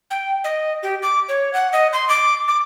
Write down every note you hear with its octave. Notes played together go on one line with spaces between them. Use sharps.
G5
D#5
G4
D6
C#5
F#5
D#5
C6
D6
D6